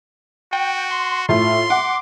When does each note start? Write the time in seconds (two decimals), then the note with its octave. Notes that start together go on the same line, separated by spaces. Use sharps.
0.53 F#4 G5
0.91 C6
1.29 A2 F4 C6
1.70 F#5 D6